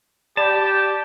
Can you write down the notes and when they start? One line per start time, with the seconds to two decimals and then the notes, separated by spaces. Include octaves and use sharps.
0.37 G4 D5 A5 B5